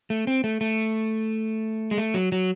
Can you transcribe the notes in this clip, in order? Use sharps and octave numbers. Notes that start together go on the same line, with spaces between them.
A3
C4
A3
A3
G#3
A3
F#3
F#3